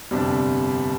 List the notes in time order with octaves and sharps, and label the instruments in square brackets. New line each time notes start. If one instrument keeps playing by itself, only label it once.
[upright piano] G1 F2 C3 G3 D4